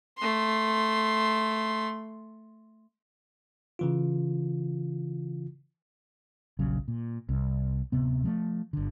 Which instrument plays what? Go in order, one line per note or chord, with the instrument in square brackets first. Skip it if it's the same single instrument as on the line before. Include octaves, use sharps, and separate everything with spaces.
[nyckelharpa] A3 C6
[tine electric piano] C#3 E3 F4
[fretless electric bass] D#1 A#1 C#3 F#3
A#2
C2
D1 C3 B3
F3 G#3 A3
G1 D3